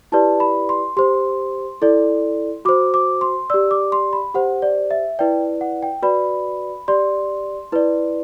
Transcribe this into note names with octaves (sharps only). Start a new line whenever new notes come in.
E4 G4 B4 D5 A5
B5
C6
G4 C5 C6
E4 A4 D5
F#4 C5 D6
D6
C6
G4 D5 E6
D6
C6
B5
G4 C5 F#5
D5
E5
E4 B4 D5 G5
F#5
G5
F#4 B4 D5 B5
G4 D5 C6
E4 B4 D5